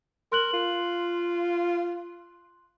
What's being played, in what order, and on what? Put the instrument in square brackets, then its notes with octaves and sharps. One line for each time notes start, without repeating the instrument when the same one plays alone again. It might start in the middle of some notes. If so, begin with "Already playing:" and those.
[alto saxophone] A#4 [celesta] C6 F#6 F#7
[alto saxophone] F4